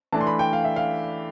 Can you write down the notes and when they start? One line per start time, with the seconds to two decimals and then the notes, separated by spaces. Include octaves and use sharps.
0.12 E3 A3 D4 A5
0.21 C6
0.27 B5
0.39 G5
0.53 F5
0.65 E5
0.76 F5